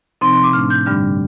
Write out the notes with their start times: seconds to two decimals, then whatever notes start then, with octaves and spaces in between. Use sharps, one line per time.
0.21 C3 F3 C4 D#4 C6
0.33 C6
0.43 D6
0.53 A2 A3 D4 F6
0.70 G6
0.86 G2 D3 G3 D4 F6